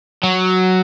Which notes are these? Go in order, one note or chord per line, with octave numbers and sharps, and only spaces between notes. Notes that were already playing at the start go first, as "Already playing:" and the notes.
F#3